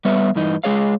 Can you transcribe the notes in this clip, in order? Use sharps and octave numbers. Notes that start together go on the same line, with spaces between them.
G3 B3 B4 C#5 E5
G2 E3 D#4
G#3 G#4 C#5 F5